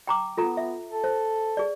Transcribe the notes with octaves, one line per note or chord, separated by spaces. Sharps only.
G5 A#5 D6
B3 F4 A4 A#5
E5
A4
C5
G#4 D5